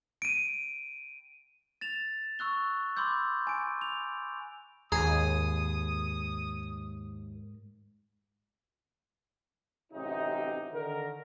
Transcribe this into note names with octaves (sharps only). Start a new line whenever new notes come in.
D7 D#7
A6 E7 F7
C#6 E6 F#6 G7
B5 C6 D6 E6 G6
G#5 D7
F7
D#2 G#2 G#4 A#5 D#6
A1 F#2 C3 D#4
D3 D#3 A#4